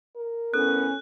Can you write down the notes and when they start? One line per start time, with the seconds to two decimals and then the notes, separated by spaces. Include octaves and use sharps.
0.16 A#4
0.54 A2 B3 C#4 A4 F#6